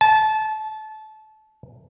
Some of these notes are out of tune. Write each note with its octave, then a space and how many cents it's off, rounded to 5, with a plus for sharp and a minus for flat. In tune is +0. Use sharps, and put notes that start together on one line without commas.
A5 -25